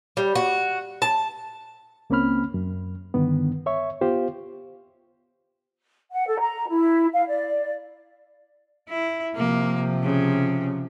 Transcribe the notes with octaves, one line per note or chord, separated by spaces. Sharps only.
G3
F#4
A5
C#2 A#3 C4 C#4 B5 F6
F#2
G2 D3 D#3 B3
C#5 E5 C#6
B3 F4 G4 C5 F5
F#5
A4
A#5
E4
F5
D5
E4
C3 F3 A#3
C#3